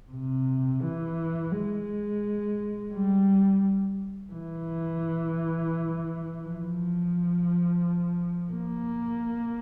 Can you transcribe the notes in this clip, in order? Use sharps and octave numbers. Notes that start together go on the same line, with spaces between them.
C3
E3
G#3
G3
E3
F3
A#3